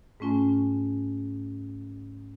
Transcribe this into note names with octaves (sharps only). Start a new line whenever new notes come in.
G#2 A3 C#4 F4 G#5